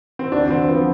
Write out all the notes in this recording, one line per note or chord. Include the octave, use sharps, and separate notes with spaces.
C4
D2 D4
D3 C4
F3 B3